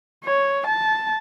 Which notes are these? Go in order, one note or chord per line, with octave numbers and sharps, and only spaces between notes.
C#5
A5